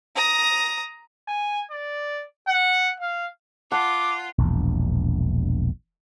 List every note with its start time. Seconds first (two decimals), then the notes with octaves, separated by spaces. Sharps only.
0.16 A#5 D#6
1.28 G#5
1.71 D5
2.48 F#5
3.00 F5
3.72 F4 F#5 A5 D6
4.38 E1 A#1 E2